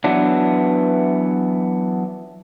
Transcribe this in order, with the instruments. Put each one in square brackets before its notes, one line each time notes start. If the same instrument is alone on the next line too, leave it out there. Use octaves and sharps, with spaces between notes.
[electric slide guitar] E3 F#3 B3 D4